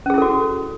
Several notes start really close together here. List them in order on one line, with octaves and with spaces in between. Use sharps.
C#4 G#4 E4 A4 F#4